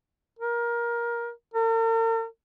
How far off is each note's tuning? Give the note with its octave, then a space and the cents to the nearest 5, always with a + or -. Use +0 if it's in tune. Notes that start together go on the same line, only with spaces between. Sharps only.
A#4 +20
A#4 -45